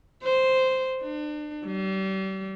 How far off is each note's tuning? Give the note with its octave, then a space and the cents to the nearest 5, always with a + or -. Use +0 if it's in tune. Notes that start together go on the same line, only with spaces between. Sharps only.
C5 -5
D4 +35
G3 -35